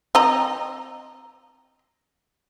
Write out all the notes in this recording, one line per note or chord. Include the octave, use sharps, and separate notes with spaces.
C4 D#5 A#5